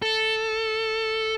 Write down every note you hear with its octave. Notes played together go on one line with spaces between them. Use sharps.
A4